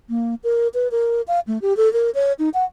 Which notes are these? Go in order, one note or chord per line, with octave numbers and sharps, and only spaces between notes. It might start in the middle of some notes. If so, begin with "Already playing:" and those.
A#3
A#4
B4
A#4
F5
A3
G4
A4
A#4
C#5
D#4
F#5